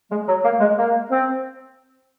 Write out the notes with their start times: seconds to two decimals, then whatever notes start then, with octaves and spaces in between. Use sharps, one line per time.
0.11 G#3
0.28 F#3
0.44 A#3
0.60 G#3
0.78 A#3
1.11 C4